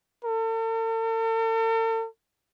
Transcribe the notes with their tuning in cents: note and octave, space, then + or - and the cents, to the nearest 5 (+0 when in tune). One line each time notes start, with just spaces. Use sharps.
A4 +45